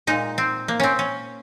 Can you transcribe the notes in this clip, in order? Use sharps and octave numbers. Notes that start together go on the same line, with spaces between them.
A#2 G#3 D#4
C4
A#3
C4 C#4
C#4